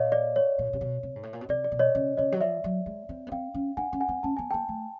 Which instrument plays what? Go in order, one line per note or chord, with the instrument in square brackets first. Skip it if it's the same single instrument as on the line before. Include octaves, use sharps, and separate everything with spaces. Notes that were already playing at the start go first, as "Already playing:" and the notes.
Already playing: [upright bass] A#2 [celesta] C#5 D#5 F5
[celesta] D5
C#5
[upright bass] A#2
C3
B2
C3
G#2
A2
A#2
B2
[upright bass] C3 [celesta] D5
[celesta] D5
[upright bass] B2
[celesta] C#5 D#5
[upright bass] C#3
[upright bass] C#3 [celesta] C#5 D#5
[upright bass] F#3
[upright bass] F3 [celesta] D5 E5
[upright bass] F#3
G#3
C4
B3
[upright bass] C4 [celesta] F5 G5
[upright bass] C#4
[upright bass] D4 [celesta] F#5 G#5
[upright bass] C#4
[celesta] F#5 G#5
[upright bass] C4
[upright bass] C#4 [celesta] A5
[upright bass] B3 [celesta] G#5
[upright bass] A#3 [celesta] G5 A5
[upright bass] A3